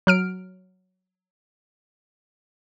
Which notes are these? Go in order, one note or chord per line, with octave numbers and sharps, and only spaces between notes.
F#3 F6 D7